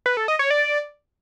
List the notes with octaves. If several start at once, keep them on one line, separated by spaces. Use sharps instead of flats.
B4
A4
D#5
C#5
D5